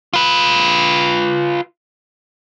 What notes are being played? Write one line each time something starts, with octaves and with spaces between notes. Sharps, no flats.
F4 B4